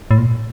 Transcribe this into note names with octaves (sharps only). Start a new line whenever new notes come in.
A2
A#2